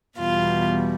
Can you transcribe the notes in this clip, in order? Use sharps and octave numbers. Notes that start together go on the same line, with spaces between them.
E2 B2 G3 F4